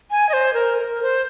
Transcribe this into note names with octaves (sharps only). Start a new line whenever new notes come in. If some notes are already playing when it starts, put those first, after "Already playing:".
G#5
D#5
C5
A#4
A#4
C5